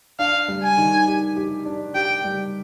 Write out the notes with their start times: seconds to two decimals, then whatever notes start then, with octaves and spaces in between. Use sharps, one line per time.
0.19 D4 F5
0.48 G3
0.63 G#5
0.78 D#3
1.07 G4
1.36 G4
1.65 D4
1.95 G4 G5
2.24 G3